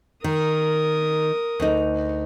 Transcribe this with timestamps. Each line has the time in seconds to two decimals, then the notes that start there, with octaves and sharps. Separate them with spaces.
0.24 D#3 A#4 D#6
1.60 D2 D#4